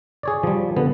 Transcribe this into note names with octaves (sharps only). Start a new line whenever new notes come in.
G#4 C#5 D5
F3 G3
D3 B3